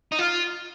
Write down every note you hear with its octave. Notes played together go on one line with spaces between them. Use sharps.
D#4
F4